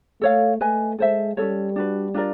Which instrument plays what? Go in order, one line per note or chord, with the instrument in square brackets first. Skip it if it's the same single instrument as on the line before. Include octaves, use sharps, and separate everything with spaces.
[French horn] A3 [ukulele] A4 C#5 F5
[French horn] A3 [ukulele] B4 D#5 G#5
[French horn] G#3 [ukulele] A4 C5 E5
[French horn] G3 [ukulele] C#4 F#4 A4 C#5
[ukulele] D4 F#4 B4
D4 F4 A#4 D5